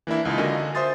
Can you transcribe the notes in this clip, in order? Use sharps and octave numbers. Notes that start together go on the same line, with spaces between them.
E3 A#3 D4 E4
C#2 D#4 F4
D3 F#4 A#4 D#5 G#5
C5 E5 C6 D#6 A6